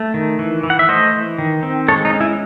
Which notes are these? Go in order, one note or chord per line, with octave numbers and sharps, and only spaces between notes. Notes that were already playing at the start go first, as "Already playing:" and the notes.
Already playing: A3
D#3
E3
E3
F#5
E5
A3 C5 D#5
E3
D#3
C4
G#3 A4 C#5
D#4
C#4
E4